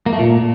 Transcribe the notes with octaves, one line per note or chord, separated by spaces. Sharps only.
A#3
A3
A#2